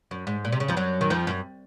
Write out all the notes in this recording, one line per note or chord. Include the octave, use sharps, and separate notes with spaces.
F#2
G#2
A#2
C3
C#3
F2 F3
F#2 F#3
D#3
F2 F3
F#2